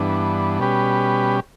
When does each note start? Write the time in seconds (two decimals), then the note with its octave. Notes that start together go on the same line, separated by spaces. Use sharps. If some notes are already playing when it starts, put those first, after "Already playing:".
Already playing: G2 E3 B3 D4
0.59 B2 G3 C#4 G4 B4